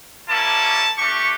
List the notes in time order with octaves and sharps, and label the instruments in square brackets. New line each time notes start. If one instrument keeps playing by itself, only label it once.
[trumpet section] G3 A#3 C#4 E4 A5
A3 D4 G4 C#6